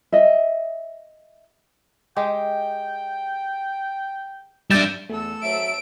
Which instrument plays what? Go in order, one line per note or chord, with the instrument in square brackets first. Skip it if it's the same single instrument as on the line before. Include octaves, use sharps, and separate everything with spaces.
[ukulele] D#5 E5
[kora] G#3 G4 [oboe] G5
[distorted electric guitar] G3 D4 [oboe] E5 [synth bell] G6 A6 E7
[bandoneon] E2 [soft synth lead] A3 [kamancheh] A4 E6
[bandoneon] F#3 E5 [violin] D7